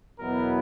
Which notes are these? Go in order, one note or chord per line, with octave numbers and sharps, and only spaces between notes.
E2 B2 F#3 B3 E4 A#4